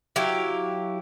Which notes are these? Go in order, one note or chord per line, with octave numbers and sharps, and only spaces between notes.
F#3 E4 G4 F5